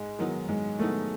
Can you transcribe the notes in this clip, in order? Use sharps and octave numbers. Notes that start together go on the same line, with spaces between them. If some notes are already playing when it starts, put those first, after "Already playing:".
Already playing: G#2 G#3
D#3 F#3 B3 D#4
G#2 G#3
D#3 F#3 A3 B3 D#4